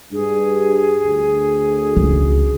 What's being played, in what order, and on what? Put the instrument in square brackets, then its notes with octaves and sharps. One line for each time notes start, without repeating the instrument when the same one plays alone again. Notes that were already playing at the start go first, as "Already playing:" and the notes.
[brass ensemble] G2 [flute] G#4
[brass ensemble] D2
[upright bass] C#2